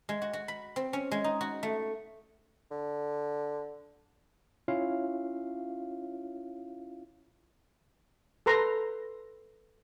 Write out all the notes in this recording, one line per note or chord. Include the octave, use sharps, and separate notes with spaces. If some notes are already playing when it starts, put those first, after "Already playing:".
G#3
F#4
F#4
B5
C4
C#4
G#3
D#4
F#4
A3
D3
C#4 E4 F4 C#5 E5 F5
A4 B4 A#5 C6